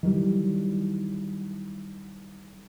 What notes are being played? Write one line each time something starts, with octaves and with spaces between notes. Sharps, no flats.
D#3 E3 F#3 G3